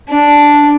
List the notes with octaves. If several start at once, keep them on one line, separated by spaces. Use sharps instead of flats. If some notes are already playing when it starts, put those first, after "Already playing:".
D4